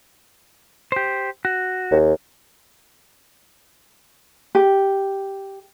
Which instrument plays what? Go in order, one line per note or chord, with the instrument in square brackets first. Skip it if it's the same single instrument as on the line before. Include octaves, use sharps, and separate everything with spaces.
[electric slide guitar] G4 C5
F#4
[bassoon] D#2
[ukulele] G4